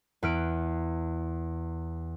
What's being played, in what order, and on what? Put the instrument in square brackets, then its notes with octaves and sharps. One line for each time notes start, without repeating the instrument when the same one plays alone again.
[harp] E2 B4 F6 D7